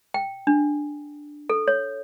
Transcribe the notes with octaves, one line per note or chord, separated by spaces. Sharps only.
G5
D4
A4
C#5